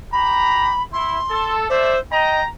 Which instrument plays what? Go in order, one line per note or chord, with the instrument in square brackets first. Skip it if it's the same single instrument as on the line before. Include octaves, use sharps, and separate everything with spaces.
[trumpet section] G4 A#5 [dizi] B5
[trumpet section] E4 [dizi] C6
[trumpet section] A4
[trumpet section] A3 D5 E5 [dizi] C5
[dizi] D#5 [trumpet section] G5 A#5